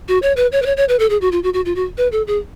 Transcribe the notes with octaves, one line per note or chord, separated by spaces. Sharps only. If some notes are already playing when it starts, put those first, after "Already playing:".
F#4
C#5
B4
C#5
B4
C#5
C#5
B4
A4
G#4
F#4
F4
F#4
F#4
F4
F#4
B4
A4
G#4